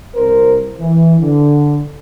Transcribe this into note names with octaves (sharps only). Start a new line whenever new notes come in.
C2 A#4 C5
E3
D3